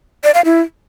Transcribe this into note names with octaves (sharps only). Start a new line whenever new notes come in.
D5
F5
E4